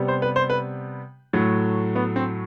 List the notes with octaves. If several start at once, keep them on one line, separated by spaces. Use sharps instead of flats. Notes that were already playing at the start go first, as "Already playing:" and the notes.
Already playing: C3 G3 B3
C5
B4
C5
B4
A2 F#3 A3
B3
C4